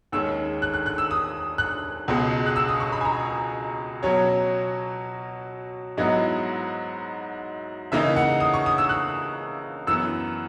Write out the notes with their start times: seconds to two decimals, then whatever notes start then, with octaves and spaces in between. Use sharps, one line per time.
0.12 D#2 D#3 G#3 C#4 E6
0.62 F#6
0.74 F#6
0.86 F#6
0.98 E6
1.11 D#6
1.58 F#6
2.08 C#2 B2 G#3
2.46 F#6
2.56 E6
2.69 D#6
2.80 C#6
2.92 B5
3.01 G#5
3.05 A#5
4.03 B2 F#3 C#4 C#5
5.97 G#2 F#3 B3 E4 D#5
7.92 C#3 E3 A#3 D#4 E5
8.16 F#5
8.40 D#6
8.54 C#6
8.66 D#6
8.78 E6
8.89 F#6
9.87 F#2 E3 B3 E6